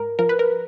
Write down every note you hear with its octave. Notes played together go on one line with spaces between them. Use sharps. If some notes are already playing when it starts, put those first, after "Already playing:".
Already playing: G#2 A#4
F3 A#4
B4
A#4